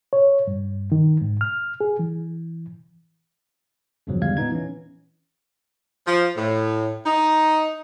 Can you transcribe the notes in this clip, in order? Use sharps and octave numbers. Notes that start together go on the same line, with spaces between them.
C#5
G2
D#3
G#2
F6
G#4
E3
E2 G2 A#2 C#3 F3 F#3
E2 D3 G3 G#3 F5 G#6
A#2 B3 D#4 G#6
E3 C#4
F3
A2
D#4